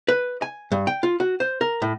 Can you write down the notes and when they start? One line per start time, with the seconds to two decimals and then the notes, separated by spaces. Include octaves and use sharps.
0.08 B4
0.42 G#5
0.72 G2
0.87 G5
1.03 F4
1.20 F#4
1.40 C5
1.61 A#4
1.82 A2